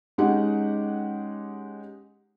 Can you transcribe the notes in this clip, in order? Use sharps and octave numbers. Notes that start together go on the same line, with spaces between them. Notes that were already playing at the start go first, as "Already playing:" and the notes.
G#3 C#4 D#4 G4 F#5